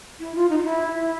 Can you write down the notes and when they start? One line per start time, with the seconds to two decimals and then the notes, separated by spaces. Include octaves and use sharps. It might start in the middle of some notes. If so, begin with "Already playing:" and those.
0.20 E4
0.35 F4
0.49 D#4
0.57 F4
0.63 E4